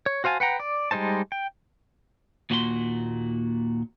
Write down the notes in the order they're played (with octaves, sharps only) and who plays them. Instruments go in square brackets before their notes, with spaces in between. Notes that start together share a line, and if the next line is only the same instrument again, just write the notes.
[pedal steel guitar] C#5
F#4 C5 F5 G#5 A5
B4 F#5 G5 A#5
D5
G3 G#3 D#4 C5 A5
G5
[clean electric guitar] D#2 A#2 F#4 G#4 C6